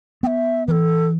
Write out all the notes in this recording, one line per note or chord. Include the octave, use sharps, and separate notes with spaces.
B3 E5 G5
E3 A4 B4